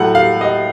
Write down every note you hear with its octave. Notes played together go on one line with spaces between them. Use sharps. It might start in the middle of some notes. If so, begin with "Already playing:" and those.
Already playing: A2 F#3 A3 F#5
F5
D#5